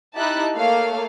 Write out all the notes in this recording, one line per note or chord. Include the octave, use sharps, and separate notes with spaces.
D#4 E4 G4 A5 F#6
A3 A#3 C#5 F5